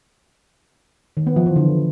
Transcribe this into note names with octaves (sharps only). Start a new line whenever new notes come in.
D#3
B3
F3
E3
D3